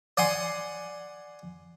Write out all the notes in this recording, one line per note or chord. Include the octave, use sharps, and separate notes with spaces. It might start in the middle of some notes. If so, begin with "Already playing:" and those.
D5 F#5 G#5 C6